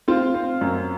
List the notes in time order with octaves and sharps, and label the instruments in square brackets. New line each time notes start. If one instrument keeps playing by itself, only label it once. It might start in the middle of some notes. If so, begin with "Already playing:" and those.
[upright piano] C4 F4 F5
C4
F#2